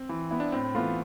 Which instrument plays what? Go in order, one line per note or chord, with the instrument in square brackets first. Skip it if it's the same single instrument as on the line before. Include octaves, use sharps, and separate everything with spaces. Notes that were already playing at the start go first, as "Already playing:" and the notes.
Already playing: [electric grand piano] C4
[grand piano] E3
B3 E4
[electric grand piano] D4
[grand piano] A2 [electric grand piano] C4
[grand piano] E3 B3 F4 [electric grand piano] A3